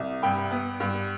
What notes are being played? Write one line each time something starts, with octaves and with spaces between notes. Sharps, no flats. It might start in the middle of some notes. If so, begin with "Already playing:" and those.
Already playing: C2
G2 G5 B5
B3
G2